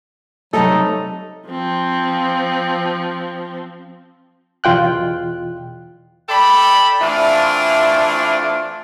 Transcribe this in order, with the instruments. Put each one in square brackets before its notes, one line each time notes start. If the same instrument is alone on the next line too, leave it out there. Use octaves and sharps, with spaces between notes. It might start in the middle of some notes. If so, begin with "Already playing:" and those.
[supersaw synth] C3 G3 A3 [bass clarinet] F#3 [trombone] D#4 [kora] A4
[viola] F3 C4
[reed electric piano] E2 B2 F4 G5 F#6
[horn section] A4 D5 G5 B5
E3 A3 C4 D4 E4 F4